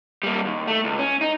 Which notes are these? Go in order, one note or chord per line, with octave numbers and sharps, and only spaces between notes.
G3 A#3
D#2
A3
C#2
C#4
D#4